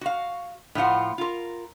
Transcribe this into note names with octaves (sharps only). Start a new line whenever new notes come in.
F#4 F5
A2 F3 F4 F#5
F4 A#4